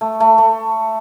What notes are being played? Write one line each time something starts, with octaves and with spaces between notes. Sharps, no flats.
A3
A3
A3